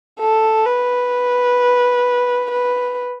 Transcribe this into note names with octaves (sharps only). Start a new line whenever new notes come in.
A4
B4
B4